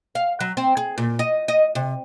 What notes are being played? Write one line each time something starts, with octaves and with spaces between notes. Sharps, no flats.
F5
F#3
C4
G#4
A#2
D#5
D#5
C3